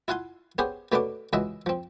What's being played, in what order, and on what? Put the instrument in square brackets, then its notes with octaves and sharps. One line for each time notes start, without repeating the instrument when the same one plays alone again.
[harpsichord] E4 F4 F#5 G#5 C6
B3 C#4 G4 G#4 C5
B2 A3 B3 C#4 D4 D6
C#2 E3 F#4 D#5 E5
F3 C4